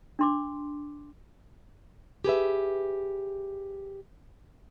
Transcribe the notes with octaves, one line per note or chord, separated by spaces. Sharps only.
D4 C6 D6
G4 G#4 B4 E5